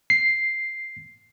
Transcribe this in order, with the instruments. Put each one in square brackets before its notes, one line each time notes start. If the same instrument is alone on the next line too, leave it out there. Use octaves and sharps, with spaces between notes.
[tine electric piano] C7